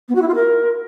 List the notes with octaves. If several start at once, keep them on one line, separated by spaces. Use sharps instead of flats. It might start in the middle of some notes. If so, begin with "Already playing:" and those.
B3
F#4
E4
F4
A#4